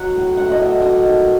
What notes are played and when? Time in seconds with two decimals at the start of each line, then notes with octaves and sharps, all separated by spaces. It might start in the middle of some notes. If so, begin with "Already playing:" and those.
Already playing: F#3 F#5
0.15 A2
0.37 A3 F#5
0.45 E5
0.52 D#5
0.59 A2 E5
0.82 F#3 D#5
1.04 D#3